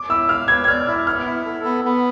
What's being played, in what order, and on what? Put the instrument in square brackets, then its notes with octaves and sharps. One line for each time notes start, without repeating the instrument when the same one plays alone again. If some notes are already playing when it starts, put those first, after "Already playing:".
Already playing: [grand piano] D6
[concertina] E4 [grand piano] E6
[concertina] F5 [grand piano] F6
[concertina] B4 [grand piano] G#6
[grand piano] G#6
[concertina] D5 [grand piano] F6
[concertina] E4 [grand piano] F6
[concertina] B3 [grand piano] F6
[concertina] E4
A4
B3
B3